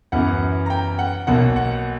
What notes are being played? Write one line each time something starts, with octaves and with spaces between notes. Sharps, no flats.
F#2 E3 B3 F#5
A#5
G5
F#5
B1 B2 A#3 F#5
F#5